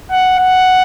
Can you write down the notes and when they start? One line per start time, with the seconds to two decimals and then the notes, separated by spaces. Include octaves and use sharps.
0.11 F#5
0.39 F#5